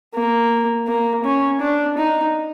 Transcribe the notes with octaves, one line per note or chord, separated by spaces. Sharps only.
A#3
A#3
C#4
D4
D#4